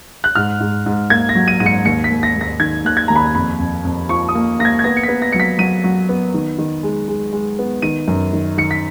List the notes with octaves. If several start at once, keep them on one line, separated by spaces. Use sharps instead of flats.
F#6
G#2 F6
G#2
G#2
A#3 G#6
A#6
F#3
D#7
G#2 D#7
C#7
D#2 C#7
B6
D#2
A#6
D#2
A#6
D#3 G#6
D#2 F#6
G#6
D#2 A#5
B5
F2 B5
F2
F2
F3 C#6
D#6
A#3
A#3 A#6
G#6
G#6
B3 A#6
C#7
B6
B3
A#6
F#3 C#7
B6
F#3 D#7
F#3
B3
D#3
D#3
G#3
G#3
G#3
B3
D#3 D#7
F#2
D#3
D#3 C#7
B6